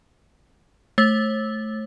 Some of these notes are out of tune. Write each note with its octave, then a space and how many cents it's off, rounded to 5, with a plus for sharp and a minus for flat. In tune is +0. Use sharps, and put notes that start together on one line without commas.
A3 -15 C#5 -40